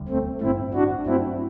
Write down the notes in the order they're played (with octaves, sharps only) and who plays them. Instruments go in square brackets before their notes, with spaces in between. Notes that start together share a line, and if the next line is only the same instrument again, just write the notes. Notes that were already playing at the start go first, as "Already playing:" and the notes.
Already playing: [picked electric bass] E1 D2 D3 G3
[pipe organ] A3 C4
[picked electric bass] A1 G2 D3 A3 [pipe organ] C4 E4
[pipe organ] D4 F#4
[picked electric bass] G2 F#3 A3 D4 [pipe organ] C4 E4